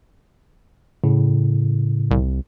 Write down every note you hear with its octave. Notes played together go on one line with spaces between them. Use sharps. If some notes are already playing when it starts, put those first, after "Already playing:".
A2 C#3
C2